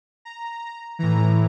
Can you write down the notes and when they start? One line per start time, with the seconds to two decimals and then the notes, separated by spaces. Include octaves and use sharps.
0.25 A#5
0.99 A2 E3 A#5